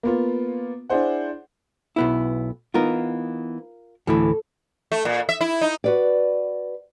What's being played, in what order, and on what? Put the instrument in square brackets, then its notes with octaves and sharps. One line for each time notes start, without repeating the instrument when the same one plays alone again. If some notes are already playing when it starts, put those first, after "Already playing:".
[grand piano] A#3 B3 F4
D4 E4 G#4 C5 F#5
[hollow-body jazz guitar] B1 B3 E4
[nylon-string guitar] E3 B3 D#4 [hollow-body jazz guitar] F4 A#4
[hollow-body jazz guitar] D2 A2 E3 [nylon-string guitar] A4
[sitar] A3
A#2
E5
E4
D#4
[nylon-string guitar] F#4 B4 D5